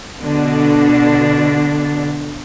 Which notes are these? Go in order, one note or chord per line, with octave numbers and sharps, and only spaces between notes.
B2 D3 D4